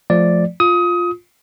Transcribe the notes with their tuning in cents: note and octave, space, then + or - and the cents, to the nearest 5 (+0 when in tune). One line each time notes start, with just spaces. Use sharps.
F3 +0 A3 -15 D5 +0
F4 +5 D#6 +25